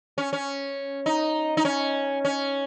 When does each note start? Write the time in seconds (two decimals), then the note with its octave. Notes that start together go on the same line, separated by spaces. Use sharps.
0.18 C#4
0.33 C#4
1.06 D#4
1.57 D#4
1.65 C#4
2.25 C#4